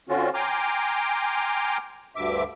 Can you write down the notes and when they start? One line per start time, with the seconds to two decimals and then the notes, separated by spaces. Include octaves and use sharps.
0.09 D3 C4 C#4 F4 F#4
0.34 G5 G#5 A#5 C6 D6 F6
2.16 D2 G2 E5 D6